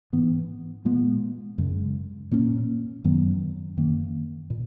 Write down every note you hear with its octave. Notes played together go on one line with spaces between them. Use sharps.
G#2 E3 B3
A#2 G#3 B3
F#2 C#3 G#3
A#2 A#3 C#4
F#2 D#3 F#3 B3
F#2 D#3 A#3
A#2